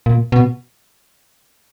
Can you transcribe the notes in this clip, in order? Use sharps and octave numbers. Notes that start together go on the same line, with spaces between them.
A#2
B2